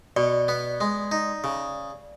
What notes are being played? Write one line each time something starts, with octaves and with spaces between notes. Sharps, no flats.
B2 D5
B3
G#3
D#4
C#3